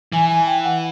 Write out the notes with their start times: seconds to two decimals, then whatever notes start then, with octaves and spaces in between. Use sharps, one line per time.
0.12 E3 G#5
0.30 G#5
0.46 G5
0.64 F#5